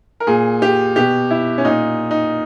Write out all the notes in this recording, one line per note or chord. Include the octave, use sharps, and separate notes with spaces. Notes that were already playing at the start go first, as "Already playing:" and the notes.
A#4
A#2 G#4
G4
B2 G4
E4
C#4
A#2 D#4
D#4